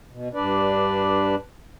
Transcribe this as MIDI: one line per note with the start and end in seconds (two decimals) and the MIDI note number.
0.10 0.28 47
0.34 1.35 43
0.34 1.35 62
0.34 1.35 71
0.34 1.35 74